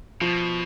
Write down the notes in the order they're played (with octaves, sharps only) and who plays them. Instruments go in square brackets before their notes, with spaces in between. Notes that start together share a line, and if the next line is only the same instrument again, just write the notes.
[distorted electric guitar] B2 [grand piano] F3